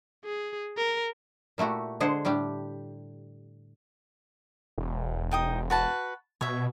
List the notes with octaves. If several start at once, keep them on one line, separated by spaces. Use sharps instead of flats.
G#4
A#4
A#2 A3 E4 F#4 G4
D3 G#3 G#4 C5 F#5
A2 G3 D4 G4
E1
D#4 G5 D#6
F#4 B4 A5
B2 C#5 E5